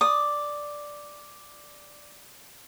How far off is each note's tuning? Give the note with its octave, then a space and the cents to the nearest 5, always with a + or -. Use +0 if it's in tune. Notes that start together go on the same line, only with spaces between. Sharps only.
D5 +0 D#6 -10